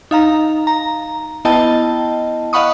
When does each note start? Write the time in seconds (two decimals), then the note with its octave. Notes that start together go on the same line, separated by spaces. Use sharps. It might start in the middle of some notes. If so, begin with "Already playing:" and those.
0.11 D#4 F5 A#5
0.67 A#5
1.45 B3 E4 D#5 G5 A5
2.53 D#5 F5 F#5 B5 C#6 D#6